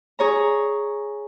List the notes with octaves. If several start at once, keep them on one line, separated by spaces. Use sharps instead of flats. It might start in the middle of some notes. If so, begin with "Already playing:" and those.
G#4 C#5 A#5